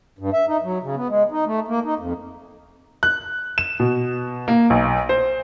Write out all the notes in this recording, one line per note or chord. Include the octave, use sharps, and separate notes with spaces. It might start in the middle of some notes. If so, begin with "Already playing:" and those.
G2
E5
D#4
F#3
C#3
B3
G#3
D#4
A3
A#3
D#4
F2
F#6
E7
B2
A#3
B1
C5